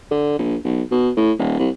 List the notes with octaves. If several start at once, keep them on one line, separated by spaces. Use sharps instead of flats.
D3
A#1
B1
B2
A2
D#1
C2